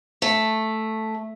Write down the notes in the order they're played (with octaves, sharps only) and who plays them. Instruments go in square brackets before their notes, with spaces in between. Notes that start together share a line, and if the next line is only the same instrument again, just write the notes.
[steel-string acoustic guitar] A3